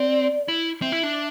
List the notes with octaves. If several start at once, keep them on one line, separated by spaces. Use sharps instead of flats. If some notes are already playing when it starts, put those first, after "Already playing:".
Already playing: C4 D5
E4
C4 E5
E4
D4